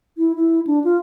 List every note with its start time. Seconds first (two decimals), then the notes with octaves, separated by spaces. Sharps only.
0.18 E4
0.36 E4
0.67 D4
0.84 F4